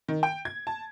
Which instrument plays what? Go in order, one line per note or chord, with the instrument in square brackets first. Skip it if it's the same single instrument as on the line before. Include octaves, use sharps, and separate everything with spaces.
[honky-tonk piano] D#3
G5
G#6
A5